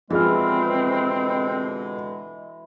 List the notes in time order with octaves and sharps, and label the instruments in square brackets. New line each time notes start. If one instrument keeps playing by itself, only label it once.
[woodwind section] B2 D3 G#3 [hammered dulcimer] E3 [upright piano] F3 G#4 F6 [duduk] C4